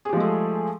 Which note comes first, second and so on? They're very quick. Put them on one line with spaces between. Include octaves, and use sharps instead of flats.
G#4 G4 F3 G#3 A3